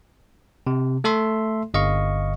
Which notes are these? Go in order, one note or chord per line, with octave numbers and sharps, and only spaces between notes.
C3
A3 A4 E5 C6
G1 D#5 F5 C#6